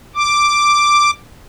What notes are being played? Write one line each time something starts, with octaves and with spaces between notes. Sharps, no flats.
D6